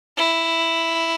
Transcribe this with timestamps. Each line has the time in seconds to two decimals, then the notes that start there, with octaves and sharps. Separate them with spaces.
0.17 E4